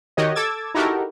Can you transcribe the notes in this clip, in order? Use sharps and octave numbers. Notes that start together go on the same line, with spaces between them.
D#3 F#4 G4 C#5 D#5
A4 D6 E6 G#6 A6
D#4 E4 F#4 G4 A4 A#4